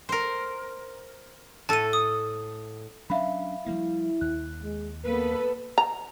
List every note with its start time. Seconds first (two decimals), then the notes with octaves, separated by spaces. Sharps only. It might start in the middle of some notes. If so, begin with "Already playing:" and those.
0.09 A#4 C5
1.69 A2 A4 A5 D#7
1.93 D#6
3.10 F#3 C#4 D4 E5 F5 B5
3.66 F3 G3 A#3 E4
4.21 D#2 F#6
4.63 G#3
5.06 A#3 B3 A4 B4
5.78 A#5